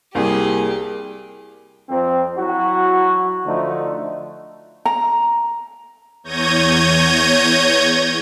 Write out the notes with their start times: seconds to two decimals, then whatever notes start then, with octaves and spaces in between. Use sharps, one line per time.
0.15 C2 A#3 G4 G#4
1.89 F2 C4
2.36 F#3 E4 F#4
3.46 D3 F3 A3 D#4
4.85 A#5
6.24 E2 C#5 G6 G#6 A#6 D#7